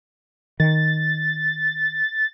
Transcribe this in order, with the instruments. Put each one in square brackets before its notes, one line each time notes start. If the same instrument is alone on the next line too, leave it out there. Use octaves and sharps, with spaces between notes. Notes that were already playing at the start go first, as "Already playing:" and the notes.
[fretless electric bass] D#3 [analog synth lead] A6